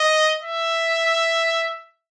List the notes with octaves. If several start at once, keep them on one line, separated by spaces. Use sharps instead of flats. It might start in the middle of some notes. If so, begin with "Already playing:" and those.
Already playing: D#5
E5